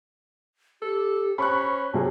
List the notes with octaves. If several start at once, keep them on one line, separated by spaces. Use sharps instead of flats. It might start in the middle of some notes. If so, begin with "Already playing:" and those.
G4 A4
C#4 C5 B5 C#6 F#6
C3 F#3 G#4 A5